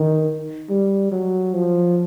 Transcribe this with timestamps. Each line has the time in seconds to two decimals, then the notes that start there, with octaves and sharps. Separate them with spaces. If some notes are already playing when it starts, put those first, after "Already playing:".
Already playing: D#3
0.69 G3
1.11 F#3
1.54 F3